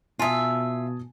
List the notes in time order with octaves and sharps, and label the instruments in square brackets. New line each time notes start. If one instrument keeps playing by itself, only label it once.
[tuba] B2 [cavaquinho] F4 E5 [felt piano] G#5 A5 D#6